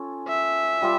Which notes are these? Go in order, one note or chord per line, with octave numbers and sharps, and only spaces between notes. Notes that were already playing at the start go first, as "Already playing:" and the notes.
Already playing: C#4 F4 A4
E5
G3 F4